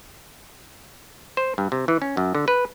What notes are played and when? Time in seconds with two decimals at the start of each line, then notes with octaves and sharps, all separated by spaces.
1.37 C5
1.58 G2
1.72 C3
1.88 E3
2.02 C#4
2.17 F#2
2.35 D3
2.48 B4